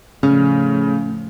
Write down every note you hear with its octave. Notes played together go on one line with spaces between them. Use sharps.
A2 C#3 F3 C#4